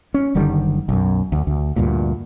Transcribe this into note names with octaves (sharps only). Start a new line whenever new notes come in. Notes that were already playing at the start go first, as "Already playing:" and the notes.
C#4
F#1 D3 D#3 G3
B1 F#2
D2
D2
D2 G2 A#2